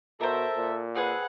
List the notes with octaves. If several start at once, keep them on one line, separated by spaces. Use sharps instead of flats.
B2 A4 A#4 C5 E5
A#2
C4 G#4 B4 F#5